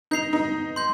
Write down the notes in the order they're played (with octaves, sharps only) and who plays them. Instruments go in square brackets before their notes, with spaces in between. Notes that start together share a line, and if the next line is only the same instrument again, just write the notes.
[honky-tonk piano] D#4 [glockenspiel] G6 C7 F7
[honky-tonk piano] D#4
[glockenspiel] C6 G6